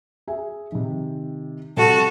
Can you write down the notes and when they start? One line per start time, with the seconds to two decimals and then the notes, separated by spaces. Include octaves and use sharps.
0.27 G#4 E5 G#5
0.72 C3 D#3
1.77 C3 G3 F#4 A4